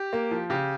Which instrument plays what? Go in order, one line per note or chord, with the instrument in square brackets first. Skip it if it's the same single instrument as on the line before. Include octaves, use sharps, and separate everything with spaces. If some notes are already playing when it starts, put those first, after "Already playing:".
Already playing: [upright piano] G4
A#3
F3
C#3 G4